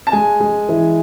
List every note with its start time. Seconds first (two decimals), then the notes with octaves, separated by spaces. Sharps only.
0.07 A5
0.12 G#3 G#5
0.40 G#3
0.69 E3